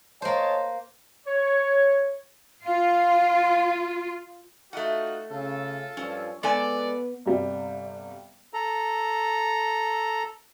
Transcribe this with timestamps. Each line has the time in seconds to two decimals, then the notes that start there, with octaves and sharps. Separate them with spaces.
0.22 A#3 C5 C#5 D#5 A5
1.26 C#5
2.65 F4 F5
4.73 A3 D#4 F4 F#4 F#5
5.31 C#3 F4 A4
5.97 G2 F3 G3 C#4
6.43 G#3 B3 A4 D5 G#5
7.26 G1 C3 G3
8.54 A4 A#5